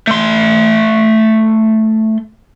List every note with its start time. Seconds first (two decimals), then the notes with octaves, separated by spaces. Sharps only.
0.07 A3 C6